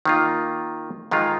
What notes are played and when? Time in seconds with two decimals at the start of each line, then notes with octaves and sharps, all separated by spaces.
0.05 D#3 A#3 F4
1.11 G#2 D#3 G#3 F4